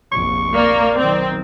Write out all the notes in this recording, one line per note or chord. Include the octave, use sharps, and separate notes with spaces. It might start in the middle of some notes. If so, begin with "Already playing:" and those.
F1 A#1 C#6
A#3 D5
B1 D#3 C4